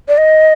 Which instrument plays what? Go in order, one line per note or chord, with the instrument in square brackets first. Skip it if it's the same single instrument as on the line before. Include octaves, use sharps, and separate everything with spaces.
[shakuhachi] D5
D#5